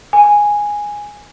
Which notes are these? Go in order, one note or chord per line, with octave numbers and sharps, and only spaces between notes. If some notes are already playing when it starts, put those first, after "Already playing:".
G#5